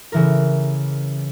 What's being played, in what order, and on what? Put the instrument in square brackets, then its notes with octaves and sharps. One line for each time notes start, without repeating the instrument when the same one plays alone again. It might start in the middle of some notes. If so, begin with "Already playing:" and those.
[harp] C#3 E3 A#4